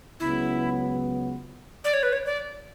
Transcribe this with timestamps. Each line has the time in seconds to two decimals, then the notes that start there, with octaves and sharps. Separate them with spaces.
0.20 C#2 C#3 F#3 B3 E4
1.84 D5
1.93 C#5
2.03 B4
2.13 C#5
2.25 D5